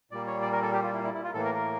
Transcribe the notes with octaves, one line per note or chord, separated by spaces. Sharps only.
A#2 G3 A#3 D5
C#5
D5
A#4
A4
G4
F4
E4
E4
E4
F4
A2 E3 A#3 A4
A#4
A#4